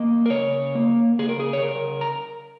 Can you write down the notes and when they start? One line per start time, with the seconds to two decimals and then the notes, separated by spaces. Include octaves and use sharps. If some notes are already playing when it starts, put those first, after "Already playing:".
Already playing: A#3 D#5
0.26 A#4
0.30 C#3 C#5
0.75 A#3
1.19 C#3 G#4
1.29 A#4
1.40 G#4
1.53 C#5
1.62 C#3 A#4
2.01 A#5